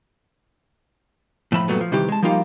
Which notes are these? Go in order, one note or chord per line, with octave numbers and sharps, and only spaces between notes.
A2 F3 E5 B5
G2 A#2 F#3 A3 B3
F3
C3 D#3 E3 G3 G4
G#3 A5
F3 G3 A#3 D#4 F4 G4